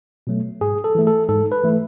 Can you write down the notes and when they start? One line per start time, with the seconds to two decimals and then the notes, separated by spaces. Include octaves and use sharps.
0.27 B2 F#3 A3
0.61 G#2 G#4
0.84 A4
0.95 E3 A3
1.07 A4
1.29 G#2 A4
1.52 B4
1.63 E3 A3